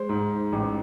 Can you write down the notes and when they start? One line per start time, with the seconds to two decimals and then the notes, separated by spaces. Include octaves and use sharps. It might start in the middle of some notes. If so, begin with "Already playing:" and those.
Already playing: G#3 C5
0.09 G#2
0.53 A1